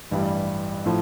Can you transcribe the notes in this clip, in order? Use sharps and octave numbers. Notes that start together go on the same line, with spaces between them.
A1 G2 E3 G3
A2 F3